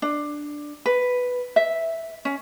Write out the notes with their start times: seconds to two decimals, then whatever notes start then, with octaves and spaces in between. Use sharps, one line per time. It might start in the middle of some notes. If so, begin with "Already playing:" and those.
0.02 D4
0.86 B4
1.56 E5
2.25 C#4